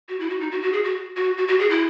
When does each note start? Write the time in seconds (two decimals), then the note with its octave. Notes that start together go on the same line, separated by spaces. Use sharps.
0.09 F#4
0.20 E4
0.30 F#4
0.41 D#4
0.52 F#4
0.62 F#4
0.73 G#4
0.84 F#4
1.17 F#4
1.38 F#4
1.48 F#4
1.59 G#4
1.70 E4